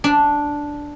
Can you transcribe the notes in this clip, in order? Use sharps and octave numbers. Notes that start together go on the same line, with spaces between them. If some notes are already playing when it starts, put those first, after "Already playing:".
D4